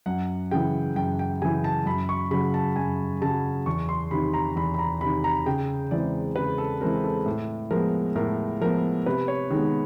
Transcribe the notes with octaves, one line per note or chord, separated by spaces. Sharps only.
F#2 F#5
C#3 E3 G5
F#2 G5
G5
C#3 E3 G#5
A5
F#2 B5
C#6
C#3 F#3 B5
A5
F#2 G#5
C#3 F#3 A5
E2 C#6
C6
C3 D#3 B5
A#5
E2 B5
B5
A#5
C3 D#3 B5
A#5
C#3 G5
E3 G#3 C4 D5
C#3 B4
A4
E3 G#3 C4 A#4
A4
A2
F3 G#3 B3 A#4
A2 A#4
F3 G#3 B3 A#4
C3 B4
C#5
D#3 G#3 B3